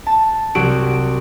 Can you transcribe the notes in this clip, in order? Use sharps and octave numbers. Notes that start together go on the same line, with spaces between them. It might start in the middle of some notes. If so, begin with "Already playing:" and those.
A5
C2 F#3 F#4 D7